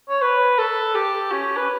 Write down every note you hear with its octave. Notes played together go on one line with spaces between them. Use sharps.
C#5
B4
A4
G4
C#4
B4